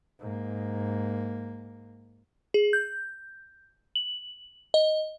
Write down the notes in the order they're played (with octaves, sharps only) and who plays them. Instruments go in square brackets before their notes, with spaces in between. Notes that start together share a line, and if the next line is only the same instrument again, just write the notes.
[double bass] G#2 A#3
[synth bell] G#4
G6
F#7
D#5